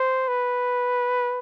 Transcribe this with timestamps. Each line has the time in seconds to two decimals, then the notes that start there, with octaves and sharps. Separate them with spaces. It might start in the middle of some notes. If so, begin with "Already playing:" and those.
Already playing: C5
0.28 B4